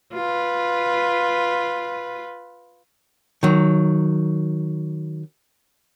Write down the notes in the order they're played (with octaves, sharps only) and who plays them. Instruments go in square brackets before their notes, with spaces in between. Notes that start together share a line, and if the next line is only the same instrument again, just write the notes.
[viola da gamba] F4 B4
[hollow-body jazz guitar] D#3 F#3